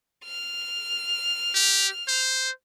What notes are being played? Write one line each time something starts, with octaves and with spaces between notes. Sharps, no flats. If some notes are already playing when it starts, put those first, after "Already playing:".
F6
G4
C5